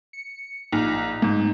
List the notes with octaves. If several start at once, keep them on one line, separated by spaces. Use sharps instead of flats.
C#7
A#1 D#4
G#2